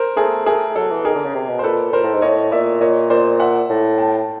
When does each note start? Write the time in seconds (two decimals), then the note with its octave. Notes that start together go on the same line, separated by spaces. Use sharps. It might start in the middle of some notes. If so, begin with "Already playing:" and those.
Already playing: A#4 C5
0.17 A3 G#4 A#4
0.46 A3 G#4 A#4
0.76 F#3 A4
0.91 E3
1.05 D#3 G#4 A#4
1.15 D3
1.25 C#3
1.35 C3
1.49 B2
1.59 C5
1.64 A#2 A4 B4
1.92 A#2 A#4 C5
2.04 A2
2.14 G#2
2.22 A2 C#5 D#5
2.52 A#2 D5 E5
2.81 A#2 C#5 D#5
3.10 A#2 C5 D5
3.39 E5 F#5
3.70 A2
3.98 G5 A5